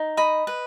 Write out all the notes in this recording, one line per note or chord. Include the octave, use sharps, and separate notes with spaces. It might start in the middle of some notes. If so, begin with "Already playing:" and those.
Already playing: D#4
D#5 B5
B4